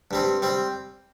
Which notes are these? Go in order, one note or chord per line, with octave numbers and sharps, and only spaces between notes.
G2 G3 C4
G3 C4